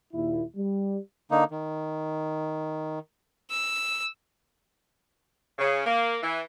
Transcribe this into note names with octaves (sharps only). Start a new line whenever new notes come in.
D#2 A#2 E4
G3
D3 A#3 D#4
D#3
E6
C#3
A#3
E3